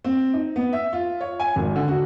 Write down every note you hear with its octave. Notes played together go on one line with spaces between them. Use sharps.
C4
D#4
B3
E5
F4
C#5
G#5
G#1
D3
F#4